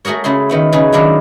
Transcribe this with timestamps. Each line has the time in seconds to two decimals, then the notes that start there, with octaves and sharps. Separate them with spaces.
0.05 A3 F#4 G#4 A#4 C#5
0.24 C#3 A3 E4 G#4 C6
0.49 D#3 B3 E4
0.72 C#3 D#4 G#4 B4
0.92 D#3 F#3 D4 E4 F4